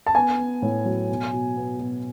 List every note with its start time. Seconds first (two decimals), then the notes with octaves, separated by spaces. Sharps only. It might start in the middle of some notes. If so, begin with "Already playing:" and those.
0.07 A5
0.15 B3 G#5
0.39 B3
0.62 A2
0.85 F#3
1.09 B2
1.33 B2
1.56 B3
1.80 B2